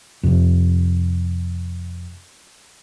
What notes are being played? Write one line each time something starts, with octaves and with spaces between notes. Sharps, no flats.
F2 C3